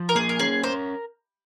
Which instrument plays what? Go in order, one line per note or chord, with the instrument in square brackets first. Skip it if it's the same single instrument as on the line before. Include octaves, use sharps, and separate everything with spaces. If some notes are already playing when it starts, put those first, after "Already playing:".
Already playing: [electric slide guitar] F3
[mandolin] A#4
[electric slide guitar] A#3 [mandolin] G#4
[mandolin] A#4
[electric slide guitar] C#4 [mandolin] G#4
[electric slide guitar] A#4 [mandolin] C5